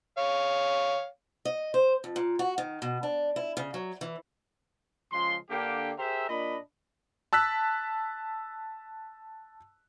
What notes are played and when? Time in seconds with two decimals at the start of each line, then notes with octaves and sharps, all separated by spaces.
0.18 C#5 F5
1.45 D#5
1.74 C5
2.04 F2
2.16 A#2
2.39 F#4
2.58 D#3
2.82 B2
3.03 D4
3.36 E4
3.57 C#3
3.74 F#3
4.01 E3
5.13 C#3 F3 G#3 C6
5.50 D3 A#3 G4
5.99 G4 G#4 A#4 C5 E5
6.29 A#2 D4 D#5 B5
7.33 A5 E6 F#6 B6